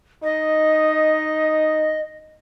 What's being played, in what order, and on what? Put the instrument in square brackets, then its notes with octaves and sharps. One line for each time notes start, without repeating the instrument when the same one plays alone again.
[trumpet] D#4 [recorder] D#5